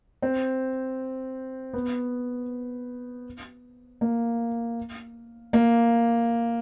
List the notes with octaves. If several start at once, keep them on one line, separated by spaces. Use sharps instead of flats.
C4
B3
A#3
A#3